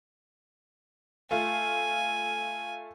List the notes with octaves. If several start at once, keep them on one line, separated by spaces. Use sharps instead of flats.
A3 F4 G#5